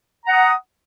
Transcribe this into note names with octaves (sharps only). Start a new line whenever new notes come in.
F#5 A#5 D#6